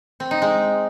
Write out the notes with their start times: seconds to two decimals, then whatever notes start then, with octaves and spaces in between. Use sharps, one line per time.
0.20 C4
0.31 D#4
0.42 G#3